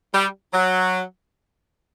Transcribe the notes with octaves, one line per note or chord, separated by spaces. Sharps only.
G3
F#3